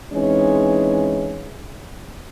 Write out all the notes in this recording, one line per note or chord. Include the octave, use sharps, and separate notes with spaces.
E3 G#3 C4 C#4 D#4